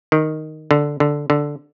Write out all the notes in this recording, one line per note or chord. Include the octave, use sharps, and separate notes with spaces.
D#3
D3
D3
D3